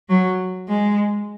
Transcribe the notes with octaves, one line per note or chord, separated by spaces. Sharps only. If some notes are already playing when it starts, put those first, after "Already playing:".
F#3
G#3